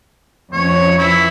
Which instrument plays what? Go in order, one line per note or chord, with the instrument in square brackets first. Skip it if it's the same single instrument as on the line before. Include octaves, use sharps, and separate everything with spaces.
[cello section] F2 C#4 [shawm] C#5
[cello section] E3 [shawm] E4